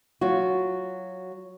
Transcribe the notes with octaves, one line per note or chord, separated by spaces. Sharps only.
F#3 F4 F#4